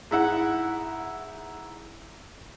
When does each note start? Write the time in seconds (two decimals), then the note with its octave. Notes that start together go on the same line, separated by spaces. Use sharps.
0.11 G#2 E4 F#5